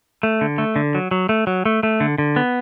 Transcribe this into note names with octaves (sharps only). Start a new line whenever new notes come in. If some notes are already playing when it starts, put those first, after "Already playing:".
A3
D3
A3
D3
F#3
F#3
A3
F#3
A3
A3
D3
D3
B3